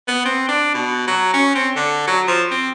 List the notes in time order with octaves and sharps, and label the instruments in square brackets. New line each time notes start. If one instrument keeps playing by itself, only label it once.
[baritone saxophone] B3
C4
D4
B2
F#3
C#4
C4
D3
F#3
F3
C4